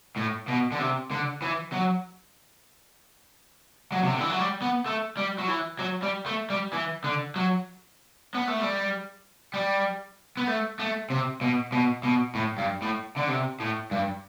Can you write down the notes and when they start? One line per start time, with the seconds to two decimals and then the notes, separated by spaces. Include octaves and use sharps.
0.17 A2
0.48 B2
0.72 D3
0.80 C3
1.11 D3
1.42 E3
1.73 F#3
3.92 F#3
4.03 C3
4.12 D3
4.21 E3
4.30 F#3
4.39 G3
4.62 B3
4.86 A3
5.17 G3
5.39 F#3
5.48 E3
5.79 F#3
6.03 G3
6.26 A3
6.50 G3
6.73 E3
7.04 D3
7.36 F#3
8.34 B3
8.48 A3
8.60 G3
9.54 G3
10.37 B3
10.47 A3
10.79 A3
11.10 C3
11.41 B2
11.72 B2
12.03 B2
12.35 A2
12.58 G2
12.82 A2
13.17 D3
13.29 C3
13.60 A2
13.91 G2